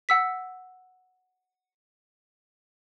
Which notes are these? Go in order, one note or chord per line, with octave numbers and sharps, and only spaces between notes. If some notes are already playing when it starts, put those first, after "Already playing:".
F#5 E6 B6